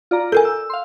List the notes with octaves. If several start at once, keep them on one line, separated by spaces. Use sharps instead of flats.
F4 D5 A#5
A4 A#4 G#5 G6
E6
F5 C6